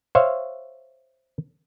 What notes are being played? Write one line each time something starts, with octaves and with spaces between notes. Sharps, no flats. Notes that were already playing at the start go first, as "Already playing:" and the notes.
C5 C#5 E5 F5